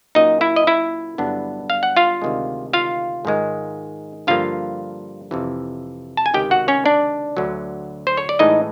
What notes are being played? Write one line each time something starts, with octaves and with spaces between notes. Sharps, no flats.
A#2 F#3 A#3 C#4 D#4 D#5
E4 E5
D#5
E4 E5
G2 D3 F#3 B3 D4
F5
F#5
F4 F5
D2 C3 D#3 G#3
F4 F5
G#2 D#3 G#3
G2 D3 F3 A#3 F4 F5
F2 C3 E3
A5
G#5
C#2 C3 D#3 G4 G5
F#4 F#5
C#4 C#5
D4 D5
D2 D3 F#3
C5
C#5
D5
A2 E3 G#3 D#4 D#5